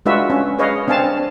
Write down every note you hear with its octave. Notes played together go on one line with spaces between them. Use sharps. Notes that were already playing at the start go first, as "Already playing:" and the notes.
G#3 D4 F4 F#4 B4 E5
C#4
G#4 B4 C#5 D#5 F5
C4 D4 F5 G#5 A5
D4